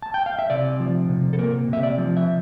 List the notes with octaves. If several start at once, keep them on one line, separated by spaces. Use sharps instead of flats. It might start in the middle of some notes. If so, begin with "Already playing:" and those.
A5
G5
F5
E5
C3 D5
F3
C3
A4
A#3 A#4
C3 E5
D5
F3
E5